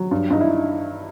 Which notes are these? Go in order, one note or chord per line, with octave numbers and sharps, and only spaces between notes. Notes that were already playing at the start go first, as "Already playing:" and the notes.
Already playing: F#3
G2
G2 D#4
E4